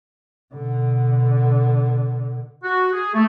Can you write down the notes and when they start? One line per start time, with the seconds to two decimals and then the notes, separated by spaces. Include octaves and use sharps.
0.54 B2 D3
2.64 F#4
2.93 G#4
3.14 A3